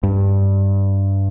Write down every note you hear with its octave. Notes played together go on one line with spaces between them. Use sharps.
G2